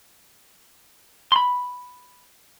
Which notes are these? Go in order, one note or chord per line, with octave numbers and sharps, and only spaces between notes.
B5 C6